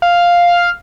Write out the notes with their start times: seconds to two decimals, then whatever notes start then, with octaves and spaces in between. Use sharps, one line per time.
0.02 F5